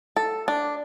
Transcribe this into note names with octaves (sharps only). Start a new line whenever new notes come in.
A4
D4